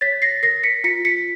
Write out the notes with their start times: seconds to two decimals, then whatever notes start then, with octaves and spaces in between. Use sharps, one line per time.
0.01 C#5 A6 B6
0.22 A#6 C7
0.43 A#4 A#6 C7
0.63 B6 C#7
0.84 F4 B6 C#7
1.05 B6 C#7